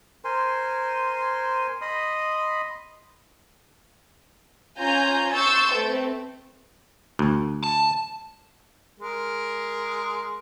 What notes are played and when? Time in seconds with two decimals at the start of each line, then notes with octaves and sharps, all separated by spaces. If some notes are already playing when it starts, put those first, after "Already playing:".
0.25 A#4 C5 G#5 C6
1.82 D#5 B5 C6 D#6
4.78 C#4 F4 G#5 A#5 G6
5.32 C6 C#6 E6 G6 A6
5.71 A3 C4 B4
7.19 D2
7.64 A5
9.00 G#3 A#4